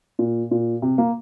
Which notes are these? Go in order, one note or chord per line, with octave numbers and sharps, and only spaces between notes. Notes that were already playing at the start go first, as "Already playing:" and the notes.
A#2
A#2
C3
A#3